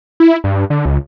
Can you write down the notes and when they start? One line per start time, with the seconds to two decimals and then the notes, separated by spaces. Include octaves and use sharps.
0.20 E4
0.44 G2
0.70 D3
0.85 C#2